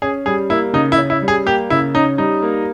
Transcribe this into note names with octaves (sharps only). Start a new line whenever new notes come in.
C#4 G#4
G3 G#4
A#3 E4
C#3 D#4
E4
C#4
E4
G3
G#4
A#3 G4
C#3 E4
C#4 D#4
G3 D#4
A#3